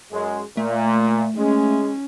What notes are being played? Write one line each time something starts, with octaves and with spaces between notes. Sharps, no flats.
F#2 G#3
A#2 A3
G#3 C#4